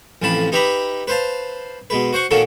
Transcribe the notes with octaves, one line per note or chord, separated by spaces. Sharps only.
A1 F2 C3 F3 A5 B5
D#4 G4 B4 E5 A#5 B5
B4 C5 F5 A5
B2 G#3 B4
F#4 C5 F#5 C#6
A#2 D#3 A#3 C#4 F#4 A4